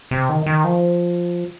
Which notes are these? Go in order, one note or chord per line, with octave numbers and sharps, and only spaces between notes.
C3
D#3
D#3
F3